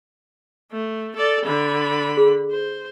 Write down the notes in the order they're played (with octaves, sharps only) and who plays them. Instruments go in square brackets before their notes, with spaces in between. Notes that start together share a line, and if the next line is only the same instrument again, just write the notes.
[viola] A3
A4 D5
D3 B5
[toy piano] G#4
[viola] C5